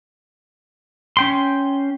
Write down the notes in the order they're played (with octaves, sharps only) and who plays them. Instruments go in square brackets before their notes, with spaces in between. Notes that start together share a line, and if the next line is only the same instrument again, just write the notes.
[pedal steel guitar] C#4 G5 C6